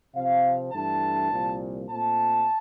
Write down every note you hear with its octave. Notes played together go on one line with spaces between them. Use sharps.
C3 F3 C4 F5
G2 E3 A3 D4 A5
C2 A#2 F3 A#3
A#2 A3 C4 A5